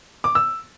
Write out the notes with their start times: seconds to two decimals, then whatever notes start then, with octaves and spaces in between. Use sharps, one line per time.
0.24 D6
0.35 E6